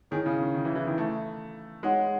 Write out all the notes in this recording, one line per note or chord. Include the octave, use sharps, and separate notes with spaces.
D#3 E4 G#4 C#5 G#5
C#3
D#3
D#3
E3
E3
D#3
A3
G#3 D#4 G#4 C#5 F#5